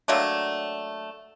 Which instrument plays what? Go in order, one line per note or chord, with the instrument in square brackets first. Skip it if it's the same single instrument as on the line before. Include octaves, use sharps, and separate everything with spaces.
[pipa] F#3 A3 A#3 D4